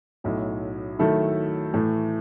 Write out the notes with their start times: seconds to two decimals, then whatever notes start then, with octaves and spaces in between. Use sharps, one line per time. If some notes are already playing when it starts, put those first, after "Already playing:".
0.24 B1 A2 F#3
0.99 D#3 F#3 A3 E4 A4
1.73 A2 E3 A3